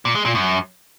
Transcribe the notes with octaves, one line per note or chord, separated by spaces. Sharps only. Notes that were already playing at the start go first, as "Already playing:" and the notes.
A#2
G#3
A#2
F#2